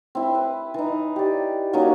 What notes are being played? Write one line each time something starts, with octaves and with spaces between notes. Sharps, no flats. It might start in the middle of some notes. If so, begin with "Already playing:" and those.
C4 E4
B4
E3 D#4
G4 D5
F#3 A#3 C#4 D#4